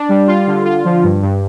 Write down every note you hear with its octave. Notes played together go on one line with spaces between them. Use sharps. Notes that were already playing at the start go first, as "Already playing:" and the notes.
Already playing: D4
G3
F4
D3
F4
F3
G2
G2